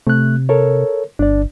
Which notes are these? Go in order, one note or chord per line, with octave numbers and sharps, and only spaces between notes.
C3 A3 F#6
A4 A#4 C#5
G1 D4 D5